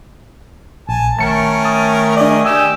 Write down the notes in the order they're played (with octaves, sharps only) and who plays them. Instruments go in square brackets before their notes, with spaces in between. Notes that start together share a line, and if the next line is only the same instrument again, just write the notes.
[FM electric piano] A#1 [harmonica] G#5 A5
[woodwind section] D#3 A3 [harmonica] C#4 A#4 [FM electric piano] A5 C#7
[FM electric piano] A5 D#6
[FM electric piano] D4 D5 [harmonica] G#4 D#5
[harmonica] G4 [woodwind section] G#5 D#6 E6